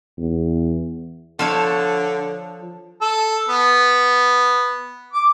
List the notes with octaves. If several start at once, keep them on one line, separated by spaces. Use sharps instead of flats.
E2
D3 F3 A4 C#5
A4
B3
D6